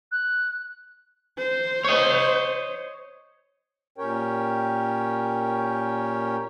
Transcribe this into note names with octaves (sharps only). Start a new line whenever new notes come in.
F#6
C5
C#5 D#5
A#2 C#4 G4 A#4 C#5 G5